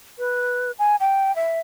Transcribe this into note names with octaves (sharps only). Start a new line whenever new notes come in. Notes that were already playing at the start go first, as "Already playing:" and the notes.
B4
G#5
G5
E5